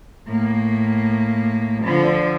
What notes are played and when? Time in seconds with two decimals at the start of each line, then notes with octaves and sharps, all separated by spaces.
0.28 A2 A#3
1.84 D3 F3